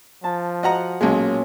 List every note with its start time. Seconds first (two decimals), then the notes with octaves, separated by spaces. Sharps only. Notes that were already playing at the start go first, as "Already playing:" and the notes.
0.24 F3 A5
0.63 F#4 D#5 F#5 A#5
1.01 B1 A#2 G#3 C#4 G#5